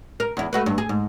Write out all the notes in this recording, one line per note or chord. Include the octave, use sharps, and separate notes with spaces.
A#4
E2 E4
A3 F#4 B4
G2
G#4
G#2